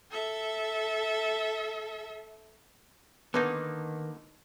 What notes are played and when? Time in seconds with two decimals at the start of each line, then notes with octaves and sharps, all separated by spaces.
0.11 A4 E5
3.34 D3 D#3 A#3 B3 D#4